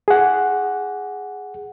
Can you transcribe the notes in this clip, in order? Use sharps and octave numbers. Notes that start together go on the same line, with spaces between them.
G#4 F#5